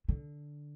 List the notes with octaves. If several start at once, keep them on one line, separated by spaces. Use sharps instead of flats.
D3